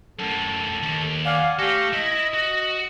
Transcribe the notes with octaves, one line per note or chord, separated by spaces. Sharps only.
F#2 A2 A4
D#2
D5 F5 F#5 G#5
A3 G4 A4 F5 C#6 A#6
E4 D#5 E5
F#4